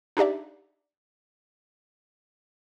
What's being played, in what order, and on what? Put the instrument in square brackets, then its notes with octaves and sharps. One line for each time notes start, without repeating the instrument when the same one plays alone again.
[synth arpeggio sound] D4 D#4 G4 D5 E5